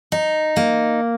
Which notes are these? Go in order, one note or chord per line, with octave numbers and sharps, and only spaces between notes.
D#4
A#3